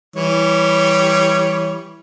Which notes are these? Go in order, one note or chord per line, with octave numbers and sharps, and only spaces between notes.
E3 G3 C#5